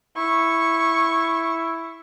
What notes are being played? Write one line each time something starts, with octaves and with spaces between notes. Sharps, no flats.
E4 C#6